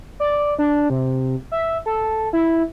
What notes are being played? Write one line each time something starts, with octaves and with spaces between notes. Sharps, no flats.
D5
D4
C3
E5
A4
E4